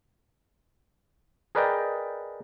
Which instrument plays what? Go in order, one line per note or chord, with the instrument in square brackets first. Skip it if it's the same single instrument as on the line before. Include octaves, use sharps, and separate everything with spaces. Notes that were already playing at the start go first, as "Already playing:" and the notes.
[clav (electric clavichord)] G#4 A#4 B4 D5 D#5 G5